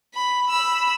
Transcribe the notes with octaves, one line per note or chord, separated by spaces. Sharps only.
B5
B5 E6